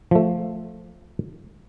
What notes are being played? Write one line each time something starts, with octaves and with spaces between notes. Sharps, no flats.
F3 A3